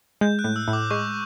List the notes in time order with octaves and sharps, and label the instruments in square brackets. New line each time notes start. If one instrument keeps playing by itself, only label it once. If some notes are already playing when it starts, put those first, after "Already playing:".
[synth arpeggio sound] G#3 [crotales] G6
[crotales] F#6
[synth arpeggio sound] A2
[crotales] E6
[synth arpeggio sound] A2
[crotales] D6
[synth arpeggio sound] G#3 [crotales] C#6